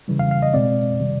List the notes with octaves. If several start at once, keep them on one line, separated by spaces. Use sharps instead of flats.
C#3 E3 G3
F5
F5
D#5
B2 G#3 C4 D5
C3 D#3 G3